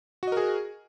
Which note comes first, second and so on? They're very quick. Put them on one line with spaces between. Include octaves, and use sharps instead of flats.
F#4 D#5 A#4 G#4